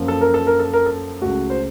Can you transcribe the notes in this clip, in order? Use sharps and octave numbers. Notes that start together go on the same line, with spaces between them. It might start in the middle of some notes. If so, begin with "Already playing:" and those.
Already playing: F#2 F3 A#3
A4
A#4
A4
A#4
A4
A#4
A4
C#2 C#3 A3 F#4
C5